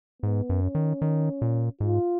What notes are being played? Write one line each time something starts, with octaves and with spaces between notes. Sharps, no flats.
G#2 B3
F#2
C#4
D#3
D#3
A#2
G#2 F4